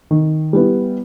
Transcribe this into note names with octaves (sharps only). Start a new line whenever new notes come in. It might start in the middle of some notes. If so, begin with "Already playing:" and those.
D#3
G3 B3 E4